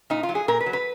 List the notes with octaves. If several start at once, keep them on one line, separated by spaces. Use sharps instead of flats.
A#2 D#4
F4
F#3
G#4
A#2 A#4
B4
F#3
B4